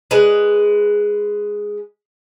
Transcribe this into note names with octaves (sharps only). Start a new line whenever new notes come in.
G#3 B4